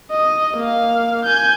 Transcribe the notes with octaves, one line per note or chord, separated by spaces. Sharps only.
D#5
A#3 F5
G#5 G6